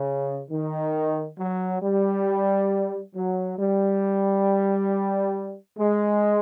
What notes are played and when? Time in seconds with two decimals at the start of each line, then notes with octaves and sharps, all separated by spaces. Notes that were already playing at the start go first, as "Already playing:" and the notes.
Already playing: C#3
0.50 D#3
1.38 F#3
1.82 G3
3.15 F#3
3.59 G3
5.78 G#3